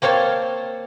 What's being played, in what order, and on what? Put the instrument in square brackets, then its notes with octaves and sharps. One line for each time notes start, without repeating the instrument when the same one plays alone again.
[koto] A#3 C4 C#5 F5 A5